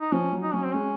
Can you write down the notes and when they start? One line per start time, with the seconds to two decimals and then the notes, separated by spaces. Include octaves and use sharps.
0.01 D#4
0.12 F3 C#4
0.33 F#3
0.43 D#4
0.54 F#3 C#4
0.64 C4
0.74 G#3 C#4